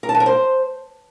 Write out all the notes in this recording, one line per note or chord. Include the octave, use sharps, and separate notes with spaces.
A#4
A5
B4
A#4
C5